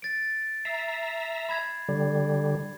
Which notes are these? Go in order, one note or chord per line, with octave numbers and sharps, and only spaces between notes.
A6 D7
E5 A#5 C7
B5 G#6
D3 G3